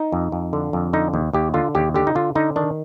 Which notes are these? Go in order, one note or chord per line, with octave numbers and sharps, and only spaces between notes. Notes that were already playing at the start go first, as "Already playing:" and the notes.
Already playing: D#4
F2
F2
D3
F2
D3 D#4
D#2
D#2 G4
D3 F4
D#2 G4
D3 G4
D#4
D3 F4
D3 D#4
D#3 D4